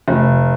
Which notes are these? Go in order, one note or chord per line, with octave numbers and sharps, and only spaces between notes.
F1